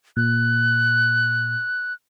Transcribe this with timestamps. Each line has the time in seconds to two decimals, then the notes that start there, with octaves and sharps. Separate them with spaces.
0.17 A#2 F#6